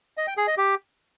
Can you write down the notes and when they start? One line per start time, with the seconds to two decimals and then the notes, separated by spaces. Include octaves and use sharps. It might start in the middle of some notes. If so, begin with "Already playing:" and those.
0.17 D#5
0.27 G5
0.37 G#4
0.47 D#5
0.57 G4